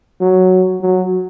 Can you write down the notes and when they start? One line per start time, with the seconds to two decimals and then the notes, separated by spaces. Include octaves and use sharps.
0.21 F#3
0.81 F#3